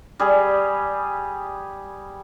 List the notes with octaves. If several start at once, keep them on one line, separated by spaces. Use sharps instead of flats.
G3 G#4